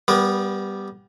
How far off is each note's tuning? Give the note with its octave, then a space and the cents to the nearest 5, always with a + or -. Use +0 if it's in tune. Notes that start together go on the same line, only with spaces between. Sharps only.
G3 +0 B3 +0 A#4 +35